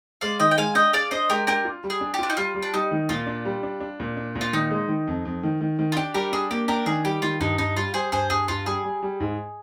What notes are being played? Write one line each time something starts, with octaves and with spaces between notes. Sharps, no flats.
G#3 D5 F5
D#3 D#5 G5
G5
G#3 F5 G#5
D4 D#5 G5
G#4 D5 F5
D4 C5 D#5
G#3 G4 A#4
D4 G4 A#4
F4
G3
G#4
D4
G4
D4 F4
D#4
G3 F4
G3
D4
G3 D#4
D#3
A#2 F4
D4
G3
D4
D4
A#2
D4
A#2
F4
D#3 D#4
G#3
D#3
F2
F2
D#3
D#3
D#3
F4
D4 G4
G3 G4 A#4
D4 G#4
A#3 G4
D4 G4 A#4
D#3 G#4
G3 G4
D#3 F4
G2 D#4
G2 D#4
G3 F4
G3 G#4 C5
G2 G#4 C5
G2 G#4
G2 F4
G3 G#4
G3
G3
G#2